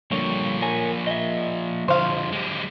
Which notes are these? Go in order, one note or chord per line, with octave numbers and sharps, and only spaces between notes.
G2 D3 F3 A#3 C#5
A#4 C#5 G#5
D#5 E5
D3 F3 C5 F5
G#3 G4